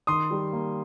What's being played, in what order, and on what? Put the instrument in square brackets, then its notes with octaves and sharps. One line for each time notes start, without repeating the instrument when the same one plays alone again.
[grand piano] D#3 C6 D#6
G3
A#3